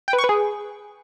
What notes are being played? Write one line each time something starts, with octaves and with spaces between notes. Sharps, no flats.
G5
B4
C#6
B4
G#4